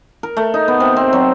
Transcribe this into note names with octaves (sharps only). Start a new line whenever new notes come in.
A#4
A3
D#4
B3
C3
C4
F#3